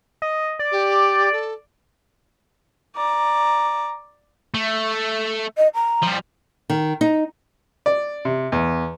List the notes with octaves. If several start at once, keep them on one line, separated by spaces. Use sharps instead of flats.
D#5
D5
G4
A4
D5 A#5
A3
D#5
A#5
F3 G3
D#3
D#4
D5
C3
E2